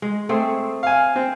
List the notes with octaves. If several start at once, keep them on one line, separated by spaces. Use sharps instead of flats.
G#3
A3 C4 G#4
F5 G#5
C4